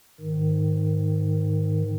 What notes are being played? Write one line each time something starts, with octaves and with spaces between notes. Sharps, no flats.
G#2 D#3